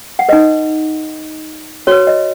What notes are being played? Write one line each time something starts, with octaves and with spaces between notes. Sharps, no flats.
F#5
D#4 B4 D#5
F#4 B4 C#5
D#5